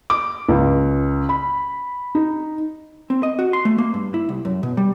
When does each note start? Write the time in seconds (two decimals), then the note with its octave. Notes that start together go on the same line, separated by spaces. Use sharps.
0.10 D6
0.48 C#2
1.29 B5
2.15 D#4
3.10 C4
3.23 D#5
3.39 F#4
3.53 C6
3.65 A3
3.78 A#3
3.94 G2
4.14 E4
4.29 C2
4.45 F#2
4.63 B2
4.77 G3